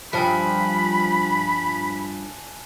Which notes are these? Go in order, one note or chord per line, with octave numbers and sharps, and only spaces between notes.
G2 F3 G#5 A5 B5 F#6